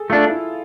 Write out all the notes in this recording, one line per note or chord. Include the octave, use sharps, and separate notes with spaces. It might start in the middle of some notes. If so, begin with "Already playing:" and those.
Already playing: G#4 A4
A3 D4 F4
E4